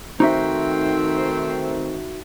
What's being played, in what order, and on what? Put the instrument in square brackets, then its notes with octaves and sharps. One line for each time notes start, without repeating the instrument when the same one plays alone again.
[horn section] D#3 A3 C4 [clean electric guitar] D#4 F#4 E5